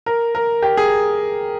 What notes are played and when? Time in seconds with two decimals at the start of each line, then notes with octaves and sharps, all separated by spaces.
0.06 A#4
0.35 A#4
0.63 G4
0.77 G#4